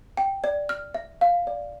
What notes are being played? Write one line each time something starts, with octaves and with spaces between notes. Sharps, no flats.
G5
D5
F6
E5
F5
D5